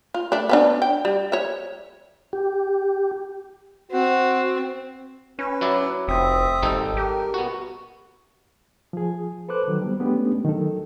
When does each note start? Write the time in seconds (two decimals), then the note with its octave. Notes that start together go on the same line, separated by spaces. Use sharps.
0.14 F4
0.32 A3 D4
0.49 B3 C#4 D4
0.82 G5
1.05 G3
1.32 C#5 E5
2.33 G4
3.92 C4 F#4
5.39 C#4 B4
5.61 F#3 E4 D5
6.08 F1 C4 E5 D#6
6.62 G#1 G3 D#4 A4
6.97 G4 A#4
7.34 B3 F#4
8.93 F3 G#4
9.49 A4 B4 C5 D6 F#6
9.68 D#3 F#3
9.82 G3 B3
10.00 G#3 A3 B3 C#4 D4 G4
10.44 D#3 F#3 A4